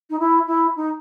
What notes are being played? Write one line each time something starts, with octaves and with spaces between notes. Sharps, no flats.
D#4
E4
E4
D#4